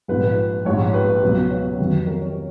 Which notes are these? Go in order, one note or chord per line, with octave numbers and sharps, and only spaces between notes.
A#1 G#2 F3 B4
B4
A#1 G#2 F3 C#5
B4
C#2 B2 F#3
C#5
F2 D#3 F#3
A#4
C#5